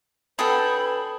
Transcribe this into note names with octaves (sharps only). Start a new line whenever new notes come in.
D3 F#3 G#4 A4 B4 G5 B5